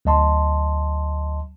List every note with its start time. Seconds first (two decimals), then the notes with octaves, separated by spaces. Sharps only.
0.05 D2 F#3 D#5 A5 C6